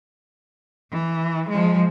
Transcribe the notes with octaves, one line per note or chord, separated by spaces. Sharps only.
E3
F3 G#3